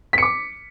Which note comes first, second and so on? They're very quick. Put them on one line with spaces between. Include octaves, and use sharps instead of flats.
B6 C#7 D6